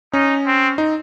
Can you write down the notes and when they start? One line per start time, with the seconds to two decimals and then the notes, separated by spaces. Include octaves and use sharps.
0.13 C#4 D#4
0.46 C4
0.78 D#4